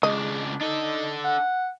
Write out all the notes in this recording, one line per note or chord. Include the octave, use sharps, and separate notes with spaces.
C#2 G#3 D4 D#5
D4 D#4 A4
F#5